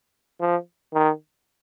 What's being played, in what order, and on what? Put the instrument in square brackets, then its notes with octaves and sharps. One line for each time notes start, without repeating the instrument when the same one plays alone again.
[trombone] F3
D#3